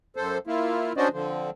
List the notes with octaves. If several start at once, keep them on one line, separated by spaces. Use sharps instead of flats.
F#2 A4 C5
A#3 E4 F4
C#4 D4 F#4 C5 D5 D#5
D3 F3 C4